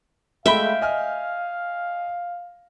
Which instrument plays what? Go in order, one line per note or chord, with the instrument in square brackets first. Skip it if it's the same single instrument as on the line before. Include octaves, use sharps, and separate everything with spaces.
[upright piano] G#3 A3 B5 [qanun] E5 G5 [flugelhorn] F5
[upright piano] D#5 G#5 F6